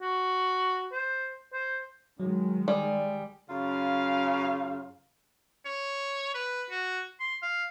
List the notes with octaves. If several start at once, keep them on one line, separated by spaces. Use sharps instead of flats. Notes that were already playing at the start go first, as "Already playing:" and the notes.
F#4
C5
C5
D#3 F#3 G#3
G3 D5 G#5 D#6
F#2 C#3 F4 F5
C#5
B4
F#4
C6
F5